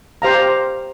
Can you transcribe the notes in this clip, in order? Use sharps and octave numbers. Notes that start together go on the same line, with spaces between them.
G4 C5 F5 A#5